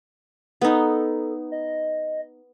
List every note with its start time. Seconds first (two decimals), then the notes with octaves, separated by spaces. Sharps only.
0.61 B3 D#4 A4
1.52 D#5